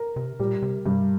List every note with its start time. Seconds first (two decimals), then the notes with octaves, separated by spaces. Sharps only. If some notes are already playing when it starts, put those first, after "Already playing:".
Already playing: A#4
0.16 C3
0.39 A#2 G3
0.62 C3
0.86 G2 C3